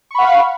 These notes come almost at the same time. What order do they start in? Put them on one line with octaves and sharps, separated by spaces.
C#6 B5 F#5 F5